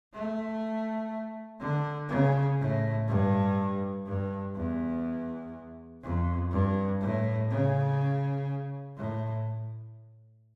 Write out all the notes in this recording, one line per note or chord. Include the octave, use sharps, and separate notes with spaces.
A3
D3
C#3
A2
G2
G2
E2
F2
G2
A2
C#3
A2